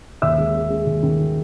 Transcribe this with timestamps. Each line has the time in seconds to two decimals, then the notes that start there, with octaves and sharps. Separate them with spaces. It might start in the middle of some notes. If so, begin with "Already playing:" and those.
0.22 D#2 E5 E6
0.38 G#3
0.54 G#3
0.70 G#3
0.86 D#2
1.03 D#3